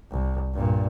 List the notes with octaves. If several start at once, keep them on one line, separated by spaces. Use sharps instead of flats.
C2
G2 A#2